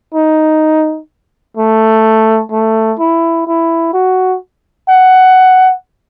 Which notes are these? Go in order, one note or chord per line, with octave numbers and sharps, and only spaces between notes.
D#4
A3
A3
E4
E4
F#4
F#5